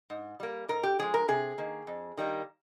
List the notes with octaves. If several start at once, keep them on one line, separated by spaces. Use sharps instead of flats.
G#2
G3 A#3
G#2 A#4
G4
F3 G#3 G#4
A#4
C3 G#4
D#3 A#3
F2
D#3 G3 A#3